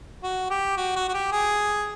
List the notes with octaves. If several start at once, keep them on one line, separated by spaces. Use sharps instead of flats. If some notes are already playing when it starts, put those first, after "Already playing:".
F#4
G4
F#4
F#4
F#4
G4
G#4